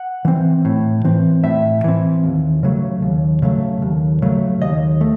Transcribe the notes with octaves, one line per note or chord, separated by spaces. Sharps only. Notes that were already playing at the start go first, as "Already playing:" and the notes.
Already playing: F#5
E3 C4
A2
E3 C4
A2 E5
E3 C4
D#2
C#3 F#3 A3
D#2
C#3 F#3 A3
D#2
C#3 F#3 A3
D#2 D#5
A3